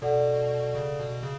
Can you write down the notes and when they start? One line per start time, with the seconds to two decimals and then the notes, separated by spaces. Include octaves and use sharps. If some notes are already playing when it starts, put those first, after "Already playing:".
0.02 B2 A4 D5 F#5
0.75 C#3
0.99 B2
1.23 C#3